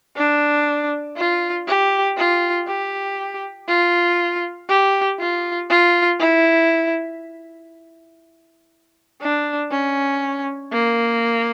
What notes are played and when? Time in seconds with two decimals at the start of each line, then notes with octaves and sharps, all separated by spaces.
0.16 D4
1.17 F4
1.67 G4
2.17 F4
2.67 G4
3.68 F4
4.69 G4
5.19 F4
5.70 F4
6.19 E4
9.21 D4
9.71 C#4
10.72 A#3